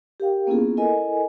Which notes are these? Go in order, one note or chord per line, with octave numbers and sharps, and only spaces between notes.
G4 A#4 F5 G5
A#3 B3 C#4 E4 F4 G#4
E4 A4 A#4 D#5 G#5